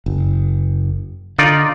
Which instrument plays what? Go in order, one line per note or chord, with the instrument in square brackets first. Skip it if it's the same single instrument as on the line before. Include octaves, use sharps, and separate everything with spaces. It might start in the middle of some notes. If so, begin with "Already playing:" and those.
[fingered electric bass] F#1
[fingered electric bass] D3 [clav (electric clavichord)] D#4 F4 D5